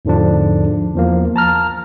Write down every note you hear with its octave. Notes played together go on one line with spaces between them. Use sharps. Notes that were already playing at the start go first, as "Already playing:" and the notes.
E2 G#2 D3 F3 D4
E2 F3 A#3
A5 A#5 F6